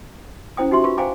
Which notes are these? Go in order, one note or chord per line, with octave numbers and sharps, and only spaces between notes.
C#4 E4 C5 G5 D#6
D#4 F#4 G4 E5 C6
F4 B4 C#6
C5 F5 G5 G#5 A#5 D6